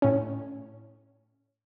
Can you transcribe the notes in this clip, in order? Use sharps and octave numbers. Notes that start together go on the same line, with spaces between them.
A2 C#4